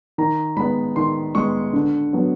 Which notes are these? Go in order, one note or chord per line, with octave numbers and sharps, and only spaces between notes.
D#3 A#5
G#3 B3 B5
D#3 C6
G#3 B3 C#6
D3
F#3 B3